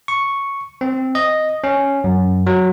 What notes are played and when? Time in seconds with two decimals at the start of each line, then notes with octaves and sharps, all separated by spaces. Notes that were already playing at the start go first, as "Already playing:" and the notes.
0.08 C#6
0.81 C4
1.15 D#5
1.64 C#4
2.04 F#2
2.47 F#3